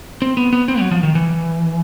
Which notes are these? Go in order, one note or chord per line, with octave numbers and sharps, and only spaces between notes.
C4
B3
B3
C4
F#3
F3
D#3
E3